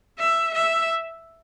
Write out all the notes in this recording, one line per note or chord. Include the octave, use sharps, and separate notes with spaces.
E5
E5